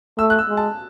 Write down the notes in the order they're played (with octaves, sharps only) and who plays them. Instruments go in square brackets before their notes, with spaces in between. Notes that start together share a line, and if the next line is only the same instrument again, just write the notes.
[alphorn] A3 [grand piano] E6
[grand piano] F#6
E6
[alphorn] G#3
[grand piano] A5